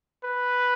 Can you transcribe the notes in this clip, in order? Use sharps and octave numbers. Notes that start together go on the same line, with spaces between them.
B4